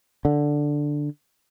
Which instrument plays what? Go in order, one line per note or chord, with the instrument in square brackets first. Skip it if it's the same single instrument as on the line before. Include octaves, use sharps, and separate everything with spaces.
[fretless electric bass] D3